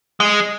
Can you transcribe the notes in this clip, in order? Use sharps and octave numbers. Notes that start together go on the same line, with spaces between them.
G#3